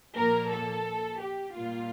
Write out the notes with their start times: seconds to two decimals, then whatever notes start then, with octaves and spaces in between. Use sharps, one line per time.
0.16 A#2 F3 A#3 A#4
0.52 A4
1.22 G4
1.56 A#2 G3 A#3 F4